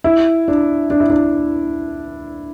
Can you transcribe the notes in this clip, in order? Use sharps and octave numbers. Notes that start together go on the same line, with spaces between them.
E4
D4
D4
E4
D4